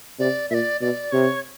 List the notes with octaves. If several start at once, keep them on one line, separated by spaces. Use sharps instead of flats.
C3 D5
A#2 D5 E5
B2 D5
C3 C#5